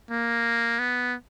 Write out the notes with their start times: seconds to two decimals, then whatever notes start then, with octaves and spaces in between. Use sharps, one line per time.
0.10 A#3
0.79 B3